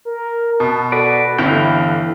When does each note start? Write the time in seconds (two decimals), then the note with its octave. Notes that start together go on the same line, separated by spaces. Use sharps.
0.05 A#4
0.60 B2 A5
0.92 F#4 A4 B4 D5
1.39 G1 E3 E4 F5 G5